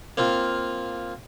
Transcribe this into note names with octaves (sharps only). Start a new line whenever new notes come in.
A#3 C4 F4